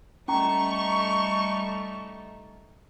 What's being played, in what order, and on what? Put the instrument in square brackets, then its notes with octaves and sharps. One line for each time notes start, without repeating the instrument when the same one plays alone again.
[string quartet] G3 A3 D#4 [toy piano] C#4 A#5 [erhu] C#6